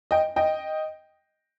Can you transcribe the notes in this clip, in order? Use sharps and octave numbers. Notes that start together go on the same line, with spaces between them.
D#5 G5
D#5 G5